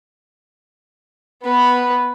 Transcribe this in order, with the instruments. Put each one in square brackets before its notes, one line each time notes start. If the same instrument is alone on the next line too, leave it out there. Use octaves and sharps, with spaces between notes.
[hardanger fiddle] B3 B4